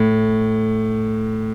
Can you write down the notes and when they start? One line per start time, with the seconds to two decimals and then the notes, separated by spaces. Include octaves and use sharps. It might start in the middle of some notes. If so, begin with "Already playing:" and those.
Already playing: A2